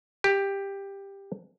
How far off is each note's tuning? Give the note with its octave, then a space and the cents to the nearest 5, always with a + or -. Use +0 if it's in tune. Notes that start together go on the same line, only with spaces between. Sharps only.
G4 +10